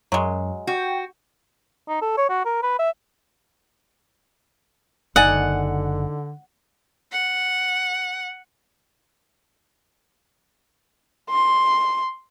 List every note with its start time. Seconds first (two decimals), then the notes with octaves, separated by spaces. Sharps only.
0.12 F#2 F#3 G#3
0.67 F#4 G5
1.88 D#4
2.02 A4
2.17 C#5
2.29 F#4
2.45 A#4
2.63 B4
2.79 E5
5.16 F#1 D3 D#4 D5 F#5 G#5
7.12 F#5
11.30 C6